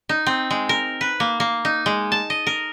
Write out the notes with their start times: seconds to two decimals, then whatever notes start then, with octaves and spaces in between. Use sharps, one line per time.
0.09 D#4
0.26 C4
0.50 G#3
0.69 A#4
1.01 B4
1.20 A#3
1.40 A#3
1.65 D#4
1.86 G#3
2.12 A5
2.30 D#5
2.47 A#4